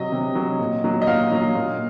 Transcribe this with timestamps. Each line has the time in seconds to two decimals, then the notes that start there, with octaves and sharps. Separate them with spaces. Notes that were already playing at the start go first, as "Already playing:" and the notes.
Already playing: C3 F#3 D#5
0.12 C3
0.35 F#3
0.59 A#2
0.84 F#3
1.02 D#5
1.07 A#2 F5
1.32 F#3
1.55 A#2